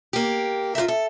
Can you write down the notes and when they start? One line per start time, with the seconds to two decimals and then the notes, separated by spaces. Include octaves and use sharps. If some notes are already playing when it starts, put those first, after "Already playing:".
0.13 A#3 G4
0.75 F4 G4 A#4 E5
0.88 A4